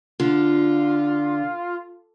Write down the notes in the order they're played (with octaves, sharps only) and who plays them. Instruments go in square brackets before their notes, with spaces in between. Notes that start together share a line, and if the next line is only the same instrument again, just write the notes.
[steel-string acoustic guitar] D3 [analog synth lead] F4